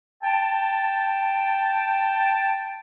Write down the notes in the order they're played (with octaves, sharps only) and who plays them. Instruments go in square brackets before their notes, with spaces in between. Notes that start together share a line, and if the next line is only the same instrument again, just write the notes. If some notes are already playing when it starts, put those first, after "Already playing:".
[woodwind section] G5 A5